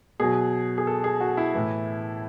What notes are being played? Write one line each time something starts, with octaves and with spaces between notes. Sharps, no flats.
B2 F#3 G#4
G#4
A4
G#4
F#4
E4
A2 E3